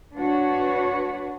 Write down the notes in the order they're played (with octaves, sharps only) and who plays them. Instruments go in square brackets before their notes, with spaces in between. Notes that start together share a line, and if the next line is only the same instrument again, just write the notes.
[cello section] D4 F#4 B4 C#5